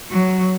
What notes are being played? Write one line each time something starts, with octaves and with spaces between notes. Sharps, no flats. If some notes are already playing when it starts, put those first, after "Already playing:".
F#3